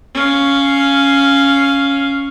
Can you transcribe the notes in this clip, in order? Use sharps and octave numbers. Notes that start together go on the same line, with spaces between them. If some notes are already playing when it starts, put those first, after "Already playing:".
C#4 F5